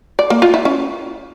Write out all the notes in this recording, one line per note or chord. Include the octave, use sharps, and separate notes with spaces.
D5
A#3
F4
E4
C#4